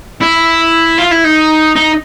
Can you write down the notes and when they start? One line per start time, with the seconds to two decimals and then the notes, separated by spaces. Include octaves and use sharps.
0.21 E4
0.98 F4
1.11 E4
1.25 D#4
1.76 D#4